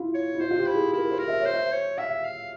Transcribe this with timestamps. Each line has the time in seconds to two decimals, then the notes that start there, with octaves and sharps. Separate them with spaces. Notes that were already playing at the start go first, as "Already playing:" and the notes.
Already playing: E4 F4
0.15 C#5
0.34 E4
0.40 F4 C5
0.51 F4
0.58 G4
0.66 E4
0.75 G#4
0.93 E4 A#4
1.11 C5
1.19 A#4
1.28 E5
1.40 C5 C#5
1.53 E5
1.72 C#5
1.98 E5 F5
2.25 F5